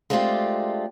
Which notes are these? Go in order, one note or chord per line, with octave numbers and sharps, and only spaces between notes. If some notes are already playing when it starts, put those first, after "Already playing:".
G#3 A3 C4 D4 F4 G4